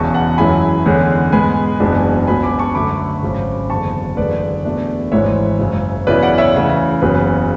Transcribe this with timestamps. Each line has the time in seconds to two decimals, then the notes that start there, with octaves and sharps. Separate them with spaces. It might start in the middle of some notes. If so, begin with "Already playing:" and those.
Already playing: E1 E2 C#3 A5 C#6
0.14 F#5 A5
0.38 F#2 E3 G#3 C#4 E4 G#5 B5
0.86 E2 D3 G#3 C#4
1.32 G#2 G#3 B3 G#5 B5
1.80 F#1 E2 B2 G#3 D4
2.27 C#2 B2 F#3 C#4 G#5 B5
2.43 B5 D6
2.59 A5 C#6
2.75 F#2 D3 A3 B5 D6
3.23 G#1 F#2 C#3
3.70 F#1 E2 D3 A5 C#6
4.17 F#1 E2 D3 G#3 B3 B4 D5
4.65 E2 B2 A3 D4
5.12 G#1 G#2 E3 G#3 C#5 E5
5.59 F#1 F#2 C#3
6.07 E2 C#3 F#3 C#4 E4 B4 D5
6.23 D5 F#5
6.38 C#5 E5
6.54 D2 C#3 E3
7.02 F#1 E2 C#3 F#3 B4